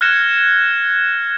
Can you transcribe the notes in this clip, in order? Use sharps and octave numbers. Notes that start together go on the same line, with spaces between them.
F6 F#6 G#6 A#6 C#7 E7